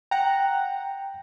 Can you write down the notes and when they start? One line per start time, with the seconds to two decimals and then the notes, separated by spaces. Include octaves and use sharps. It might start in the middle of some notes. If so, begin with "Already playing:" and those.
0.11 F#5 G5 A#5